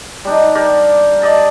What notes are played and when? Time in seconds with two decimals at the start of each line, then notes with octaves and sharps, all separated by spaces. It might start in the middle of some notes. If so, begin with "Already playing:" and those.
0.25 G3 D4 D#4
0.55 G4 A#4 D5
1.21 D5 D#5 A5